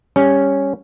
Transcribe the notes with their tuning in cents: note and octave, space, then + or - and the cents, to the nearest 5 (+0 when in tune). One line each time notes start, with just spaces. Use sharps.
G3 +20 C#4 +0